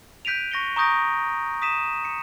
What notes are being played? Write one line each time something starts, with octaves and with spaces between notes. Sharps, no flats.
F#6 G6 B6 D7 D#7 F7
C#6 A#6 C#7 G7
A#5 C#6 D#6 G6 A#6 D7
D#6 B6 D#7 E7
C#7